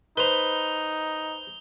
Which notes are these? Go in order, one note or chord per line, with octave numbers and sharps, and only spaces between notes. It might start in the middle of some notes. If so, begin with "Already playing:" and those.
D#4 B4 C5 B5 F7 G7